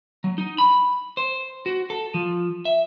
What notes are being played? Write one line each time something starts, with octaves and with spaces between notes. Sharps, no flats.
F#3
D#4
B5
C5
F#4
A4
F3
E5